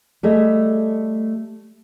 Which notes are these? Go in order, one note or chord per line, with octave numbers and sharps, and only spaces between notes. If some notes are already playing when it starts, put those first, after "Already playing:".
G3 A3 G#4 D#5